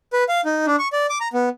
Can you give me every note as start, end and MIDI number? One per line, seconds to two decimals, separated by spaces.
0.13 0.24 71
0.29 0.41 77
0.45 0.66 63
0.67 0.76 62
0.79 0.88 85
0.93 1.07 74
1.09 1.18 86
1.20 1.28 82
1.33 1.49 59